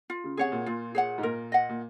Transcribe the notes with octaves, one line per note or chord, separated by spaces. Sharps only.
F4
C#3
C3 G#4 C#5 F#5
A#2
A#2 F4
G#4 C#5 F#5
G#2
A#2 A#4
D#5 F#5
A#2